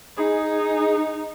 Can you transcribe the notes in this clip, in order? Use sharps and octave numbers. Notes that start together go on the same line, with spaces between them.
D#4 G#4